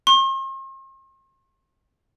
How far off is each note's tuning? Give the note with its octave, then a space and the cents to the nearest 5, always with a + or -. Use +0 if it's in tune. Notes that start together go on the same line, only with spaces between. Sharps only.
C6 +45